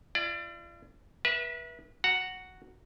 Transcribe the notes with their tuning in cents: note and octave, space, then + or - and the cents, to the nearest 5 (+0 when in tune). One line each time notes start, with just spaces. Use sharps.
F4 -45 D5 +20
B4 -35 E5 +0
F#4 +0 F#5 +0 A#5 -10